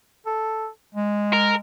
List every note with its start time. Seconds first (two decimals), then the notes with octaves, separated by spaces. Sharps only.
0.26 A4
0.94 G#3
1.33 A#4